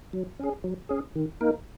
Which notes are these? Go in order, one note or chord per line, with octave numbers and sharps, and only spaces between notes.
F#3
C#4 G#4
F#3
C#4 G#4
D#3
A#3 D#4 A#4